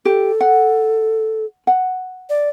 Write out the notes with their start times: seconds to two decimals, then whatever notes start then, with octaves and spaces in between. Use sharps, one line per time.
0.05 G4 A4
0.41 F#5
1.67 F#5
2.30 D5